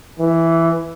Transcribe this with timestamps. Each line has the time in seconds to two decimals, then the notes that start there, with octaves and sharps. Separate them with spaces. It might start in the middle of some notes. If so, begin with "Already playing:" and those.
0.20 E3